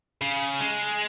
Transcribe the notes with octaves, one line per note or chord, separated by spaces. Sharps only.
C#3
G#3